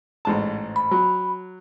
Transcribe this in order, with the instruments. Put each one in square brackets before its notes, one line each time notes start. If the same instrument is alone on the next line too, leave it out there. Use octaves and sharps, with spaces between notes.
[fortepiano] A1 G#2 A5
[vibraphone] B5
[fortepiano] F#3